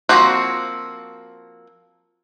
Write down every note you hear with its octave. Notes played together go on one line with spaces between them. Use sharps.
F3 G#3 A#3 C4 F#4